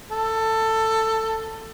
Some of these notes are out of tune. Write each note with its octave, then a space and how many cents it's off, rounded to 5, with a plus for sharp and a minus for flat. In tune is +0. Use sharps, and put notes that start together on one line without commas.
A4 +15